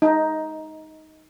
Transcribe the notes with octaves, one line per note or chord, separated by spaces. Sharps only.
D#4